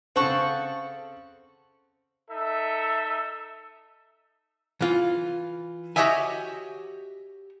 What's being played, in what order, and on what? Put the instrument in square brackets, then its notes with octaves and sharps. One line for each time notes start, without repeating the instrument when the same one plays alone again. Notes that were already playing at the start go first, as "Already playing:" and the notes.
[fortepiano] C#3 C4 [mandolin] A4 F#5 C#6
[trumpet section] D#4 E5 [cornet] A4
[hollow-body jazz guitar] E3 F4
F#4 G4 C#5 D#5 E5 G#5